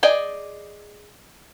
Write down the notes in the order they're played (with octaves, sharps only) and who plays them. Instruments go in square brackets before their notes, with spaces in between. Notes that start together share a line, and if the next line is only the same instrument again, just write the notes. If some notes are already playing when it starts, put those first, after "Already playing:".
[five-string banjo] G#4 D5 D#5 G5